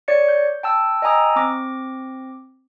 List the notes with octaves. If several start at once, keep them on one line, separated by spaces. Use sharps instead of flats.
C#5 D5 C#7
G6
G5 A5 E6
D#5 G5 G#5 A#5 D#6 E6
C4 D6 A#6